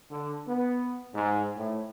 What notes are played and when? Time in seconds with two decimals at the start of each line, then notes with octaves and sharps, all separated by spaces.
0.11 D3
0.47 B3
1.14 G#2
1.56 A2